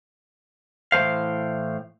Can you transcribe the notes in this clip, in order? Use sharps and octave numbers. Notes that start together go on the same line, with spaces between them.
A2 E3 A3 C5 F5